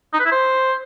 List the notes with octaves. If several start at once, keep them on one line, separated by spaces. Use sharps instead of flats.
D#4
B4
E4
C5